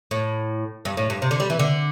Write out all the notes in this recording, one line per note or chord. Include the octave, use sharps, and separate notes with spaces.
A2
G2
A2
G2
C3
D3
G3
E3
D3